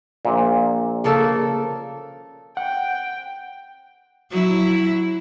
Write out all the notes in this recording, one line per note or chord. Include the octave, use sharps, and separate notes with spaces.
A#1 A#2
C#3 A#3 A4
F#5 G5
F#3 E4